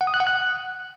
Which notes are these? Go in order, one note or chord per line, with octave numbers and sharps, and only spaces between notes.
F#5
D#6
F#6
F#5
F#6